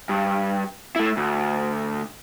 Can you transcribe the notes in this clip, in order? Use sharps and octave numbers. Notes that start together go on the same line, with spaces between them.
G2
A3 E4
D2